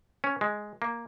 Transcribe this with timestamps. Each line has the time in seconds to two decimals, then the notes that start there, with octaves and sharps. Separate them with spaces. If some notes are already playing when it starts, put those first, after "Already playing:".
0.24 C#4
0.41 G#3
0.82 A#3